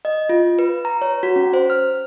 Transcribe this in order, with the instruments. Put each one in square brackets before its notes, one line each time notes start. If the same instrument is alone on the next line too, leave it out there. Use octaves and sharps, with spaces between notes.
[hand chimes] D#5
F4
B4
A#5
C#5
F#4
C#4
C5
F6